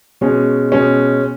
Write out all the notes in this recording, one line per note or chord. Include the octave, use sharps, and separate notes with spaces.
B2 G#3 C#4
B2 G#3 C#4